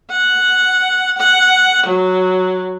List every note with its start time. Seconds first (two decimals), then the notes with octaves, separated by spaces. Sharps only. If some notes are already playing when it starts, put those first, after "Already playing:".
0.11 F#5
1.17 F#5
1.86 F#3